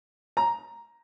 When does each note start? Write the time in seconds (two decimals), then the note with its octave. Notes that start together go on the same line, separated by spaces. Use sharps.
0.37 A#5